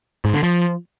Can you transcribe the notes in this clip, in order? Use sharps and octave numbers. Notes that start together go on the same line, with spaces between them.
G#2
D3
F3